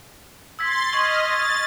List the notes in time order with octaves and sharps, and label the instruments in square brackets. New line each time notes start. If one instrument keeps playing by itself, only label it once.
[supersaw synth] C6 A6 [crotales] E6 G#6 B6
[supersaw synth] D#5 F6 [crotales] C#6 G#6 F#7
[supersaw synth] A6